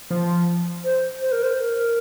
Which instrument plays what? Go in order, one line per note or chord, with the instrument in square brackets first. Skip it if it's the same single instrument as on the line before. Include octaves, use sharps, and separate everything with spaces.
[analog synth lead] F3
[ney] C5
C5
A#4
C5
A#4